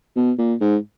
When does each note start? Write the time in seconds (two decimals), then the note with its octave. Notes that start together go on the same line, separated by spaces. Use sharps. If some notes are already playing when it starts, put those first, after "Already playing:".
0.16 B2
0.38 A#2
0.61 G#2